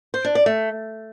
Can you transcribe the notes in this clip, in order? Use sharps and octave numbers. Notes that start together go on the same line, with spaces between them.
C5
D4
D5
A3